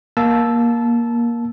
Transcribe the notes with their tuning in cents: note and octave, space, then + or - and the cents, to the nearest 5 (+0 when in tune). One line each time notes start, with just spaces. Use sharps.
A#3 +15 A5 -15 E6 +0